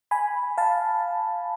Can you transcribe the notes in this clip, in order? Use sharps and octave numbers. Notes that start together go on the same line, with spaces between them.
G#5 B5
F5 A5